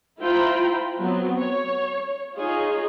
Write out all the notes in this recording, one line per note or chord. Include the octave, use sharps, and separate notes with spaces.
E4 F4 C5 G5 A#5 B5
F#3 B3 C4
C#5
D#4 F4 G#4 C#5 D#5